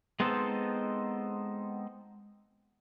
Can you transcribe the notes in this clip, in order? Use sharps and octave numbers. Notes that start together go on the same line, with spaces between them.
G#3 B3 C4 D#4 A4 C5